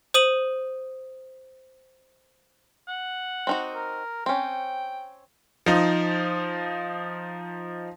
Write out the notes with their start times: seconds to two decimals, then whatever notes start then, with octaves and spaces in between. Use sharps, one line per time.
0.14 C5 D#6 D#7 F#7
2.88 F#5
3.47 C4 D#4 F#4
3.74 A#4
4.26 C4 C#4 G5
5.66 F3 D#4